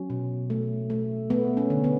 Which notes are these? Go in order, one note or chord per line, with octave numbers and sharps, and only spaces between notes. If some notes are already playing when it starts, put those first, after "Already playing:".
Already playing: F#3 C#4
B2
A3
A3
A3 B3
C#4
D3
B3